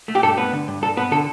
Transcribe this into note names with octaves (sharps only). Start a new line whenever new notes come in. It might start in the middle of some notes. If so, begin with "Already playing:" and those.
A3
G4
G2 A4
B3 B4
D3
G2
G2 A4
B3 B4
D3 A4